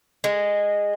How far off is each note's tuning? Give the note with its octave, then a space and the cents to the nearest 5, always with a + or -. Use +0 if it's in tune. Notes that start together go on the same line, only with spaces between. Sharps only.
G#3 -15